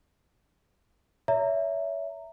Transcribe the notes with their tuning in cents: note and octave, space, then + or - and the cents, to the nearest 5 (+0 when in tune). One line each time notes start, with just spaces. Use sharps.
C#5 +35 E5 +5 A#5 -15